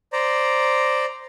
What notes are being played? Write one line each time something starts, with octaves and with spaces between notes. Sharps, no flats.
C5 D5 A#5